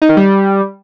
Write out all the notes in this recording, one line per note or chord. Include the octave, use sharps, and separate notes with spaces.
D#4
D#3
G3